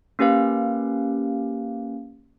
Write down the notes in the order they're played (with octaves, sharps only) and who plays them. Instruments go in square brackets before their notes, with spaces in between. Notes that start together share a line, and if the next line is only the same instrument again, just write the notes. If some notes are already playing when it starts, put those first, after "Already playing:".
[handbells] A#3 C#4 G4 B4 F5